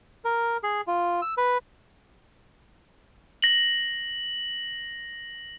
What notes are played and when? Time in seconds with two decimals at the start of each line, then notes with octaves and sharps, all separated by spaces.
0.25 A#4
0.63 G#4
0.87 F4
1.22 E6
1.37 B4
3.42 A#6 F#7